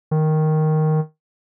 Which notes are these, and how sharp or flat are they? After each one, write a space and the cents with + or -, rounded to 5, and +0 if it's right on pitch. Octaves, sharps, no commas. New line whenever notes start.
D#3 +0